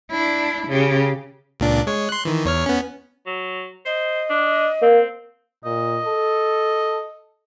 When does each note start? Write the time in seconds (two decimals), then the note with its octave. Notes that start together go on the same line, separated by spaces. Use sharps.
0.11 D4 E4
0.68 C#3 G4
1.60 C#2 A#2 D4
1.87 G#3 C#5
2.09 C6 F#6
2.25 D#3 E3
2.45 E2 C#5 F6
2.66 B3 C#4
3.27 F#3
3.85 C5 D#5
4.30 D4
4.82 A#3 C4
5.64 A#2 D#5
6.04 A4